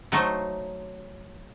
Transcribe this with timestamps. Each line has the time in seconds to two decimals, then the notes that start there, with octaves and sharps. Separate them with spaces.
0.12 F#3 A3 D#4 C5